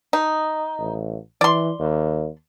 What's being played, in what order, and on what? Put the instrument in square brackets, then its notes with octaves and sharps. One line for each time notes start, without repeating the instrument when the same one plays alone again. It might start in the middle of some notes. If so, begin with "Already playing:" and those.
[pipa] D#4
[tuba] A1
[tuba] E3 [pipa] D5 C6
[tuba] D#2